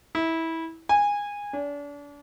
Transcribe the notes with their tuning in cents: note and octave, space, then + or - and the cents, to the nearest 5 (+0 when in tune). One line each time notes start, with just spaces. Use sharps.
E4 -20
G#5 -20
D4 -35